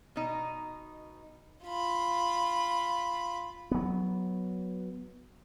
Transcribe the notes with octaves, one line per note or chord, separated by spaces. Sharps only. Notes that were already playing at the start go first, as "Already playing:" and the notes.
B2 D#4
F4 B5
F#3 B3